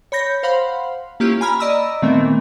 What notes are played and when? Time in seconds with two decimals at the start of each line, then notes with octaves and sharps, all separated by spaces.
0.12 C#5 B5 G6 A#6
0.43 C5 F5 F#5 B5 C6
1.20 A#3 C#4 E4 F4 G4
1.41 G#5 A#5 B5 F6
1.60 D5 D#5 A#5 B5 E6
2.02 A#2 D#3 E3 A3 B3 C4